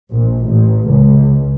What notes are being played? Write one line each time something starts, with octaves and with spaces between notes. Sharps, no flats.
A#1
A1
C#2